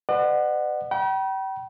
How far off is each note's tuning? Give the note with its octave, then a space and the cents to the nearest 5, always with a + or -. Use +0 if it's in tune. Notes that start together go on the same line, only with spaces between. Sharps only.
B4 +45 D5 +45 F#5 +0
G5 -35 B5 -45